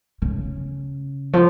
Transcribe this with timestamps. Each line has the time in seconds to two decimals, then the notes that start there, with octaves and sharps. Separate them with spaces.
0.22 C#3
1.33 F3